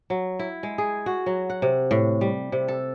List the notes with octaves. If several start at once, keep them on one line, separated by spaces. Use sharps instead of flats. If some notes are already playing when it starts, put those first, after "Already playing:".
F#3
E4
G#3
G#4
F#4
F#3
F#5
C3
A2
G3
C3
A4